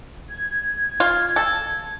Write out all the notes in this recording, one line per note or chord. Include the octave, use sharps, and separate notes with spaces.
G#6
F4
A4